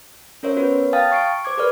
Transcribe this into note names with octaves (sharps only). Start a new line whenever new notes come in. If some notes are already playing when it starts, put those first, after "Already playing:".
C#4 A#4 C5 C#5 E5
B3 F#4 B4 C#5
F5 G5 A5 D#6 F6 A6
C#6 C7 D7
C5 D6 G#6
G#4 A#4 B4 D5 F6